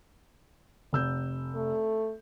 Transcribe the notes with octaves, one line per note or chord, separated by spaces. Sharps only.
F1 E6 G6
A3